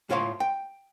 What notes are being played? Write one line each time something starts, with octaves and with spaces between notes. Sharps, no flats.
A2 F4 C#5 F5 C6
G5